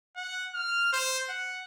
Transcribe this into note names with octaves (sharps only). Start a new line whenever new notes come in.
F#5
F6
C5
F#5